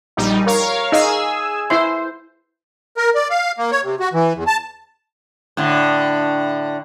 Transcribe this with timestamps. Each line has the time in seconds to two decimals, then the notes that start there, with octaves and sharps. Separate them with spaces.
0.17 A#1 G3 D#4
0.46 A#4 C#5 F5
0.92 D#4 G#4 D#5 F5 G#5 E6
1.70 E4 C5 E5 C6
2.97 A#4
3.15 D5
3.30 F5
3.58 A#3
3.71 C#5
3.84 C3
4.00 F#4
4.13 E3
4.36 E2
4.47 A5
5.57 A2 D3